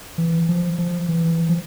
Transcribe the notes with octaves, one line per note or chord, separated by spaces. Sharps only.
E3
F3
F3
E3
F3